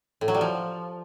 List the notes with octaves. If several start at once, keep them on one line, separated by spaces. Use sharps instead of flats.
A2
F#3
G3
F3